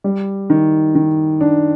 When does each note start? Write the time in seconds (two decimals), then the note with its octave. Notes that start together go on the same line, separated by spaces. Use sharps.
0.04 G3
0.50 D#3
0.95 D#3
1.41 D4